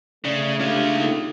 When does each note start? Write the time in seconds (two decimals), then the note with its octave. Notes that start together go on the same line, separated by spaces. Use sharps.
0.25 C#3 A3 D5
0.60 C#3 D4 F4 G4
0.95 A#3 D#4 A4